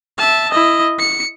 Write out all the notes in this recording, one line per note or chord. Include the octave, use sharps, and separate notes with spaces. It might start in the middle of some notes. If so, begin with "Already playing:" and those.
E5 A5
E4 D#5
C#7